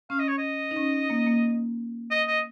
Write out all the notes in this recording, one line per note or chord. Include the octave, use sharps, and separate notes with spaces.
C#4 F5
D#5
C#5
D#5
D#4
C#4
A#3
A#3
D#5
D#5